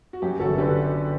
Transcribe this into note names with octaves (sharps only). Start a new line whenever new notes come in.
F#4
F#2 G4
G1 F#4 A4
A4
D3 G4 B4